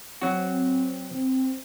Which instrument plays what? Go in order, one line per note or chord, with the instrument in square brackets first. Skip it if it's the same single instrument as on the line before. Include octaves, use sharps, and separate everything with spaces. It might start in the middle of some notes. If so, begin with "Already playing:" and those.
[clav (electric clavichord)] F#3 F#4 [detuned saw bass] C4